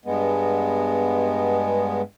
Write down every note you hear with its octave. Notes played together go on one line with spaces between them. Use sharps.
G2 G#3 B3